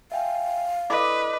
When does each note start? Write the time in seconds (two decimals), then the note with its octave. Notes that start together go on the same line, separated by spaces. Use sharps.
0.12 E5 F5 G5 G#5
0.90 E4 A4 B4 D5 D#5 B5